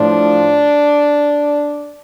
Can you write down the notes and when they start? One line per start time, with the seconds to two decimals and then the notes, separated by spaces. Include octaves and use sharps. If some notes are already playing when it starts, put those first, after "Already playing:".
Already playing: A2 F3 D4